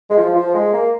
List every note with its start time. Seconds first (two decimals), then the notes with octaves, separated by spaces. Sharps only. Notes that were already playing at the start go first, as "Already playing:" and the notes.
0.10 G#3
0.17 F3
0.35 F3
0.54 G#3
0.73 A#3